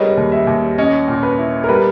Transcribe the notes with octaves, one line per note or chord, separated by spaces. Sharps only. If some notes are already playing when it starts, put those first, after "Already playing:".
Already playing: G3 G#3 G#4 A#4 B4 C#5 D#5
D#2
E5
D#2
C#4 D#5
A#2
B4
E4
A#4
G3 B4